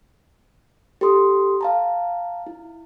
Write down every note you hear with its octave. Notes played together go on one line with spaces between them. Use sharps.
G4 A4 C6 D#6
F5 A5 A#5
E4